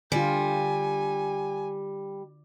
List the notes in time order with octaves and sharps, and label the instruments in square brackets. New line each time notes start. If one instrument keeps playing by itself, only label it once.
[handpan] D3 F4 [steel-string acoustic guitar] G3 [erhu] G#5